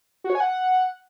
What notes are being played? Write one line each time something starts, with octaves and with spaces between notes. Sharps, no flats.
F#4
C#5
G#5
F#5